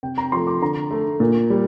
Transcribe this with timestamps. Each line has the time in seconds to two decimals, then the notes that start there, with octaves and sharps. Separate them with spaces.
0.03 C3 G5
0.18 A#5
0.32 F3 A3 C6
0.47 D6
0.62 D3 A#5
0.91 A3
1.20 A#2
1.50 G3